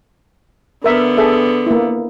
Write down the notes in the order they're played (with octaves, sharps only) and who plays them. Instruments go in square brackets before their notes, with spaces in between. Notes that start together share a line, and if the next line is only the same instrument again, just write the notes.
[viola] D3 B3 [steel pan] A#4 E5
[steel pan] G#4 A4 E5
A#3 E4